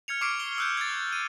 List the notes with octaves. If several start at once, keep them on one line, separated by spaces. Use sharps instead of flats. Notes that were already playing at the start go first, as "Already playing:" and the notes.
F6 G#6 C#7 F7
C#6 D6 F6 C7 D7
G7
E6 F#6 G6
G#6 A6
D#7